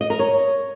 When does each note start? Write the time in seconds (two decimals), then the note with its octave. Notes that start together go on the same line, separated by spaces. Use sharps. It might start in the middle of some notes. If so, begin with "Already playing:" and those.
0.01 D#5
0.10 A#4
0.19 C#5